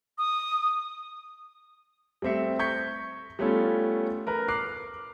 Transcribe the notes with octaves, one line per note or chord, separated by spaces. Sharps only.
D#6
G3 A3 C4 E5 C#7
C#6 G6 G#6 B6 C#7
G3 A3 B3 C#4 F4 A4
A#4 B4 A#5
D6 F6 F#6 C7